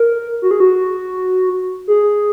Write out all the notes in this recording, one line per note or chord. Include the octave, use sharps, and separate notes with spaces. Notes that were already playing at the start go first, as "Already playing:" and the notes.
Already playing: A#4
F#4
G#4
F#4
G#4